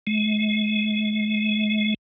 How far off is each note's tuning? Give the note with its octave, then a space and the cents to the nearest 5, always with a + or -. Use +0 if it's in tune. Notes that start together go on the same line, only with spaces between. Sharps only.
G#3 +45